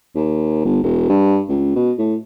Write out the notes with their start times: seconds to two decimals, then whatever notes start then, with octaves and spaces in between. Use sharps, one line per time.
0.15 D#2
0.65 G1
0.83 E1
1.09 G2
1.49 C#2
1.75 B2
1.98 A2